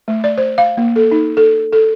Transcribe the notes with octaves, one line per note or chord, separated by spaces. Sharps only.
A3
D5
C5
F5
A#3
A4
D#4
A4
A4